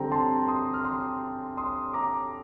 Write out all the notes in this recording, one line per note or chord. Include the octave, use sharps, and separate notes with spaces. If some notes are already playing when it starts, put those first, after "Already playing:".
Already playing: D3 G3 C4 G5 A#5
A5 C6
C6 D#6
F6
C6 D#6
C6 D#6
A#5 D6